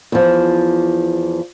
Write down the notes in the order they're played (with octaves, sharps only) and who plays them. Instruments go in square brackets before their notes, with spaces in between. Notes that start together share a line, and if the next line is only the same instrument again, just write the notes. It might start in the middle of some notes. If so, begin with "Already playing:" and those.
[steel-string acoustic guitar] E2 F3